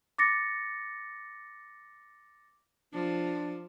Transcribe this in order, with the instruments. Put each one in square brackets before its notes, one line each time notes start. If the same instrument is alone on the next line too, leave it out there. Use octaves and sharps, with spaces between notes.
[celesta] D6 A6 A#6 C#7
[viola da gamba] F3 [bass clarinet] D4